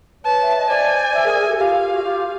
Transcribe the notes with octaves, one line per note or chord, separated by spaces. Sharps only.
B4 C#5 A5
E5
D#5
C5 D5 G#5
D5 E5
G#4 A#4
G#4 A#4
G4 A4
F4 G4 F5
F#4
F4 G4